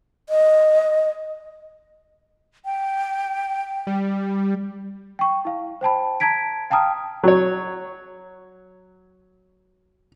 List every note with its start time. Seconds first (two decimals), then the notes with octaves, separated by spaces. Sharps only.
0.29 D#5
2.65 G5
3.87 G3
5.19 G5 C#6
5.45 E4 F5
5.81 C5 G5 A5 B5
6.20 A5 A#5 G#6 B6 D7
6.70 F5 G5 A5 A#5 D#6 F6
7.23 F#3 C#5